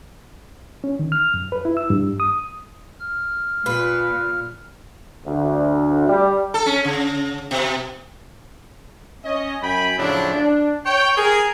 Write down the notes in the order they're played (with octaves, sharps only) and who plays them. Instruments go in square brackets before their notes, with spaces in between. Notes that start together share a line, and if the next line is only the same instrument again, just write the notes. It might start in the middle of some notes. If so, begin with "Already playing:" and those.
[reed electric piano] C#4
D#3
F6
F#2
B4
E4
E6
G2
D#6
[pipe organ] F6
[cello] A#2 [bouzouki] B4
[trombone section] D2
G3
[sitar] A4
C#4
C#3
B2
[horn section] C#4 D#5
F#2 G5 G#5 B5
A2 C#3 F3 F#3 D4 E4
D4
C#5 G5
G#4 A#4